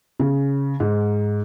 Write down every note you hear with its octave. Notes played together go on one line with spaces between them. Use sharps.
C#3
G#2